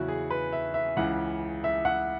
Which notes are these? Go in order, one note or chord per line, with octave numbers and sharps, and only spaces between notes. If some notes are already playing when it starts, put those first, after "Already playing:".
Already playing: E2 C#3 F#3 E4 F#4
G#4
B4
E5
E5
C#2 C#3 E3 F#5
E5
F#5